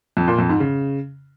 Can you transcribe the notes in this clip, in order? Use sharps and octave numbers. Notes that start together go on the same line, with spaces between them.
F2
A#2
F2
G#2
C#3